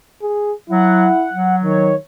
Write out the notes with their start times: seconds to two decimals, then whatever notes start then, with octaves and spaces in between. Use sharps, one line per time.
0.22 G#4
0.70 F#3 E4 F#5
1.33 F#3
1.64 D#3 C#5